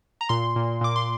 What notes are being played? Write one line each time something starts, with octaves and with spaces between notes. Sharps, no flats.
A#5
A#2 C6
A#2
A#2 D6
C6